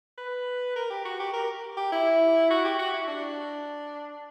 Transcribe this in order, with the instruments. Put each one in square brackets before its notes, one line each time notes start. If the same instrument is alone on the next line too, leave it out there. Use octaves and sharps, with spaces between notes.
[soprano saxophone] B4
A#4
G4
F#4
G4
A#4
G4
E4
F#4
G4
F#4
E4
D4